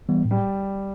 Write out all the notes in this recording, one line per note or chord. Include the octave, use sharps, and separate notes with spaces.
E3 G3 B3
A2
G3